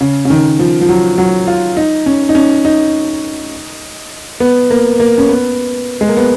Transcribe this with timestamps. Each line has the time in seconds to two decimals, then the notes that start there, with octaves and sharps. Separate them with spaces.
0.01 C#3
0.25 C#3
0.30 D#3
0.59 F3
0.81 F3
0.89 F#3
1.18 F#3
1.47 F4
1.77 D#4
2.06 C#4
2.29 D#4
2.35 C#4
2.65 D#4
4.40 B3
4.70 A#3
5.00 A#3
5.18 C#4
5.29 B3
6.01 G#3
6.09 A#3
6.17 B3